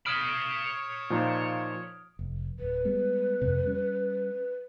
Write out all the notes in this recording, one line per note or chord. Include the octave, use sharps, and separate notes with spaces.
C#5 B5 D#6 F6 D7
A#2 F3 D#4
F1
D1 B4
G3 G#3 B3
F2 G#2 C3
G3 C#4